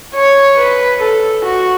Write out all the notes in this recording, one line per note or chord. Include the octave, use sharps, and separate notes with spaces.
C#5
B4
A4
F#4